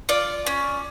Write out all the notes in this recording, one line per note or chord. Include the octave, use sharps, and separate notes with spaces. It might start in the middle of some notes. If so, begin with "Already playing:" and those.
F4 D5
C#4